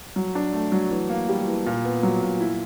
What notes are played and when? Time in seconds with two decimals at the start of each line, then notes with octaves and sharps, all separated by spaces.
0.16 F#3
0.35 D4
0.53 A3
0.72 F#3
0.91 E3
1.10 A#3
1.29 G3
1.47 E3
1.66 A#2
1.84 B3
2.03 F#3
2.22 A#2
2.40 E4